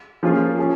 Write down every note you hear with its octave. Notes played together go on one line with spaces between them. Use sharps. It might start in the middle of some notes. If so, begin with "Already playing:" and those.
F3 A#3 C#4 F4 G#4
C#4 G#4